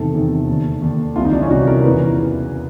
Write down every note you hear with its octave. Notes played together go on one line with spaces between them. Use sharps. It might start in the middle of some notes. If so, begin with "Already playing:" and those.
Already playing: E2 C3 D#3 A4
E2 C3 D#3
D#2 D3
D#2 D3
C2 C3 E3 F4
D#4
D4
C#4
C2 C3 E3 F#4
A#4
E2 C#3 E3 B4